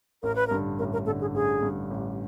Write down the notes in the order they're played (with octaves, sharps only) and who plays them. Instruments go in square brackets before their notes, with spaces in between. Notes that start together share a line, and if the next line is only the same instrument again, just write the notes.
[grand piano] A1 [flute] A#4
[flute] B4
[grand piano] G2 D3 [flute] A#4
[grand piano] A1 [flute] A#4
[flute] A#4
[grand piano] G2 D3 [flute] A4
[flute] G#4
[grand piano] A1 [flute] G#4
[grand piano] G2 D3
A1